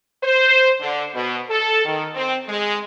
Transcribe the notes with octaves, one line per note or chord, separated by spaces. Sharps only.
C5
D3
B2
A4
D#3
C4
G#3